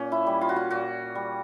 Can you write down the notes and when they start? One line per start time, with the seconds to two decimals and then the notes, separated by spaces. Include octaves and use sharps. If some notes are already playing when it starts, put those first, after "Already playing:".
Already playing: A#2 C#4
0.12 E4
0.27 G3
0.41 F4
0.49 F#4
0.56 F4
0.70 A#2 F#4
1.15 G3